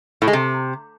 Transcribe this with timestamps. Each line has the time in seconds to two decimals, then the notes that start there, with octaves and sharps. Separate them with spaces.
0.22 A2
0.28 G#3
0.33 C3